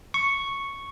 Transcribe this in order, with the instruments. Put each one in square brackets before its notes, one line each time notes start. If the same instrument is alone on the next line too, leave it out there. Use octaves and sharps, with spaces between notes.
[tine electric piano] C#6